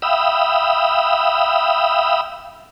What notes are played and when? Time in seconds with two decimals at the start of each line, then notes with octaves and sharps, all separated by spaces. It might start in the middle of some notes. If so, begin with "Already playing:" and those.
0.02 E5 F5 G5 B5 D#6 E6